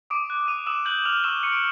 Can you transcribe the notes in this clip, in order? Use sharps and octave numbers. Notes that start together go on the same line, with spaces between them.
D6 D#6 D7
F#6
D#6 D#7
D#6 E6 E7
F#6 G6 F#7
F6 G6 F7
C#6 E6 E7
C#6 C#7
D7